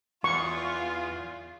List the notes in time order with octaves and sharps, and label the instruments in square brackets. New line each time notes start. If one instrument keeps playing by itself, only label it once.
[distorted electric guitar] E2 [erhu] F4 [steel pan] C#6